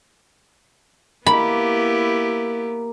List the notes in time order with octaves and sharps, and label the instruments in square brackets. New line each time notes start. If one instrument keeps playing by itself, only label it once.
[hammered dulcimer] A#3 [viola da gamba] B3 E4 G4 [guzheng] B5